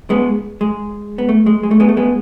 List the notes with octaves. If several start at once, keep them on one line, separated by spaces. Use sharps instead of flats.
G#3 B3
G#3
B3
A3
G#3
G#3
A3
G#3 B3
A3
G#3 B3